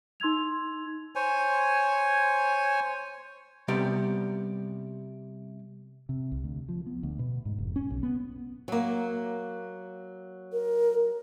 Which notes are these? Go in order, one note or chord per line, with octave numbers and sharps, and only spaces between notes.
D#4 C6 E6 G#6 F7
C5 C#5 G#5
C3 G3 B3 G4 D5 B5
C3
C2
D2
F3
B3
D2
B2
G#2
F1
C#4
B1
B3
F#3 A#3
A#4